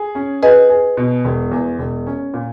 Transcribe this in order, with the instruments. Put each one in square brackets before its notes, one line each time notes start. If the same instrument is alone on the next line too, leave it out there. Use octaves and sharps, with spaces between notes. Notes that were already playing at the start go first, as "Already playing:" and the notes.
Already playing: [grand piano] G#4
C#4
[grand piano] G#4 [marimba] B4 D#5
[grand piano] G#4
B2
E1
E2
E1
C#4
A#2